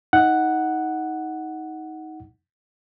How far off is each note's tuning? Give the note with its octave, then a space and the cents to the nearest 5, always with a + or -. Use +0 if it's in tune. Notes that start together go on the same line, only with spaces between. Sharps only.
D#4 +20 F#5 +0